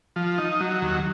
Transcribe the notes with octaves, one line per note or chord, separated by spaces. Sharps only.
F3
D#4
F#3
D#2